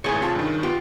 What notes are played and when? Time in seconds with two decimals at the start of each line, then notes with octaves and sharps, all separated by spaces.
0.04 G#1 A2 G#4 C#5
0.21 C3 F4 A5
0.35 G2 D#3
0.63 B3 F4 G4